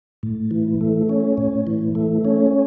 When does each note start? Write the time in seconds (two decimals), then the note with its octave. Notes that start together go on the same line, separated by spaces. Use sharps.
0.23 A2
0.51 E3
0.81 A3
1.09 C#4
1.37 A2
1.67 E3
1.95 A3
2.25 C#4